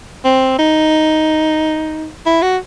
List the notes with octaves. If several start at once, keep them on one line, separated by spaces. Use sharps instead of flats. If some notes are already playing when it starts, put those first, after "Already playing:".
C4
D#4
E4
F#4